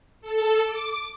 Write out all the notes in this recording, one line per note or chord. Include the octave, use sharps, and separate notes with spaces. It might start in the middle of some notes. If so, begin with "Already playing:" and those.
A4
D6